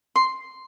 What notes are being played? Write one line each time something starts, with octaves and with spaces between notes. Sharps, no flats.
C6